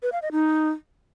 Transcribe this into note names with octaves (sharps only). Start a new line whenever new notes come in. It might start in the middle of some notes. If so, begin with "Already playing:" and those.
B4
F5
D#5
D#4